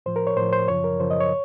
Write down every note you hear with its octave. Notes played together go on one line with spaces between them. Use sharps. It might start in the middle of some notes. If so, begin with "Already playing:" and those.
A2 F3 C5
A#4
C#5
A2 F3 C5
C5
F#2 C#3 F3 C#5
A#4
F#2 C#3 F3 C5
D#5
C#5